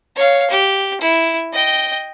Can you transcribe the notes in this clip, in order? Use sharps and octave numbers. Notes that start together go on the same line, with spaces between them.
C#5 F5
G4
E4
D#5 G5